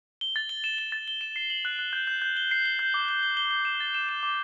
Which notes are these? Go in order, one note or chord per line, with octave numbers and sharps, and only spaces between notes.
G7
A6
G7
E7
G7
A6
G7
E7
C7
F#7
F#6
F#6
G6
G6
G6
G7
C7
G7
G6
D6
G7
G7
G7
G7
E7
A6
E7
E7
D6